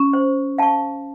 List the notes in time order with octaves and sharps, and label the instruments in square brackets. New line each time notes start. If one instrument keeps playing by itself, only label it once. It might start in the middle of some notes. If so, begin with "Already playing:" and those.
Already playing: [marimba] C#4
[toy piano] C5
F5 A5 C#6